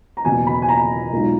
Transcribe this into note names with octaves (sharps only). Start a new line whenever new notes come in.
A#5
F#1 E2 B2 G#5
B5
G#5
A#5
B1 A#2 G#3